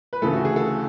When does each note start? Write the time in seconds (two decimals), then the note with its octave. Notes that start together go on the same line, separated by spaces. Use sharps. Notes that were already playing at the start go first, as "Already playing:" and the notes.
0.13 B4
0.22 D2 C#3 E3 A4
0.33 F#4
0.45 G#4
0.56 A4